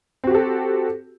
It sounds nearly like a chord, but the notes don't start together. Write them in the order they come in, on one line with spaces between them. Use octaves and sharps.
C4 F#4 G4 A4